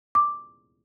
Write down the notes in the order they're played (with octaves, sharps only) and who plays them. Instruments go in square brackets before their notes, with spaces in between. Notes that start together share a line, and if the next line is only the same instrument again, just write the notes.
[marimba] D6